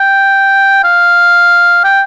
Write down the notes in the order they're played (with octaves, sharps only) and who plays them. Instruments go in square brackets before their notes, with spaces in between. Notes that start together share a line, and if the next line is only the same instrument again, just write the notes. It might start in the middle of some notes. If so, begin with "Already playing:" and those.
Already playing: [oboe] G5
F5
G5